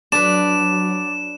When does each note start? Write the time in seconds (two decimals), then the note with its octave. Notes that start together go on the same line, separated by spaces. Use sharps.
0.12 F#3 D4 B4 D5 E7